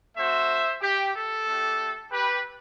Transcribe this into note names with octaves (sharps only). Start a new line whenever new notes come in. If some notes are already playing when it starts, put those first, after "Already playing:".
A3 C4 F#4 C5 E5
G4
A4
A3 D4 G4
G4 B4